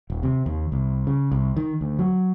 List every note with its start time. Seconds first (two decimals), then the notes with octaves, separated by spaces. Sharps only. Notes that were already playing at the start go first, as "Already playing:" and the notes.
0.10 D#1
0.23 C3
0.46 D#2
0.72 C2
1.07 C#3
1.32 C2
1.57 D#3
1.81 D2
1.99 F#3